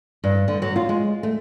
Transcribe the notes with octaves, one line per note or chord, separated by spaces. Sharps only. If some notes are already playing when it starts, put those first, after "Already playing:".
G2
D3
F#3
F4
G#3
A3